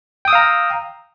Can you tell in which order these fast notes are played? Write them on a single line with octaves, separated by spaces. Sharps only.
G5 D#6 E6 F5 A#5